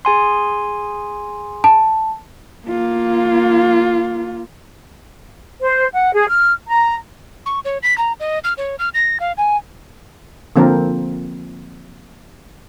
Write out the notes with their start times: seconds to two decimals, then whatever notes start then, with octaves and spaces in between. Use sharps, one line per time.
0.05 G#4 G#5 C6
1.64 A5
2.67 A#3 F4
5.61 C5
5.94 F#5
6.13 G#4
6.28 F6
6.68 A#5
7.46 C#6
7.65 C#5
7.83 B6
7.98 A#5
8.20 D#5
8.44 F6
8.58 C#5
8.79 F6
8.94 A#6
9.20 F5
9.38 G#5
10.56 D3 F3 A#3 C4 A#4